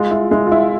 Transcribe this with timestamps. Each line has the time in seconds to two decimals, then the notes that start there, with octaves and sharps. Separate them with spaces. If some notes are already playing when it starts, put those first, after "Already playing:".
Already playing: G#3 F4
0.11 E4
0.31 G#3 E4
0.47 F4
0.52 E4